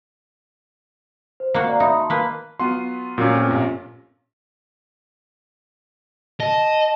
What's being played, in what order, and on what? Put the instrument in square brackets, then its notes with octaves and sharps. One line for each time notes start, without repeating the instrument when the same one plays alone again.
[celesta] C5
[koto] A#3 F#4
[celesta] D5 F5 A#5
[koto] D#4 [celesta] E5 B5 D#6
[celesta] A5 C6
[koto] A#3 B4
[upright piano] F#3 B3 F4 [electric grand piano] C6
[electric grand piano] A#2 A#3 C#4 [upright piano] F#3
[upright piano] A3 C4 F4
A#1 C3
[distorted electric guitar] D#5 [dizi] A5